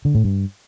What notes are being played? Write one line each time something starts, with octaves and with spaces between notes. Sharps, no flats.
D3
A2
G2